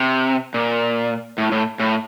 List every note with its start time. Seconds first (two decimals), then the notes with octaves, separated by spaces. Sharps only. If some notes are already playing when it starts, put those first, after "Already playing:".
Already playing: C3
0.54 A#2
1.38 A2
1.52 A2
1.80 A2